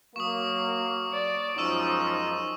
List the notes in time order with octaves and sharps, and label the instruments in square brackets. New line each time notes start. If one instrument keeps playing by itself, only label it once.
[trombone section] F#3 A#3 [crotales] C#6 D#6
[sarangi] D5
[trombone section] F#2 G#3 D#4 [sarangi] F3 [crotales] C#6 E6 D#7